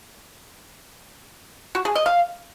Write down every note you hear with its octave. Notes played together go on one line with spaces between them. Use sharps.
F#4
G#4
D#5
F5